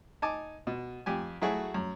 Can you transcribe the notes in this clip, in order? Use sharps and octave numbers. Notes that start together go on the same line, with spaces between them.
D#4 G#5 A5 D6
B2
F2 G4 G#5
F#3 A3 E4 F#4 G#4
F#2